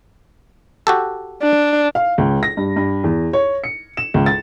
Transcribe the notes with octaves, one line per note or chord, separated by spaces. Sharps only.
F#4 G4 A4
D4
F5
C#2
A#6
G2
G2
E2
C#5
C#7
E7
C#2
A6